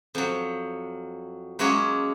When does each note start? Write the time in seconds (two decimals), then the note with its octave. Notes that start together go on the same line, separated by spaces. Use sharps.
0.15 F2 F#3
1.59 F#3 G#3 A#3 C#4 F#4 G#4